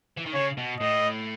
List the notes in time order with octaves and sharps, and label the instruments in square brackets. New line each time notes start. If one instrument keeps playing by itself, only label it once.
[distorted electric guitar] E3
D#3
[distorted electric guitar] C#3 [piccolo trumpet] C#5
[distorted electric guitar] B2
[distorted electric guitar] A2 [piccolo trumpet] D#5